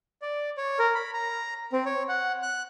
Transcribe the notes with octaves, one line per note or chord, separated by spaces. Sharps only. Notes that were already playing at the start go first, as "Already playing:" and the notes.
D5
C#5
A#4
B5
A#5
C4
C#5
F#5
F#6